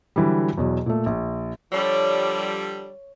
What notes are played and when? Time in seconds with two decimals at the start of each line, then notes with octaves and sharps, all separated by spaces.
0.16 D3 E3 F#3 G3
0.58 E2 B2 F#3
0.86 A#2 A3
1.06 A#1
1.72 D3 F3 G3 C#5